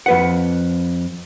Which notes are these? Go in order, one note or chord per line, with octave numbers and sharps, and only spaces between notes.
F2 B4 F#5